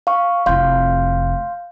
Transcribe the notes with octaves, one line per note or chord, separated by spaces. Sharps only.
F5 C#6
F1 E4 F5 C6 G6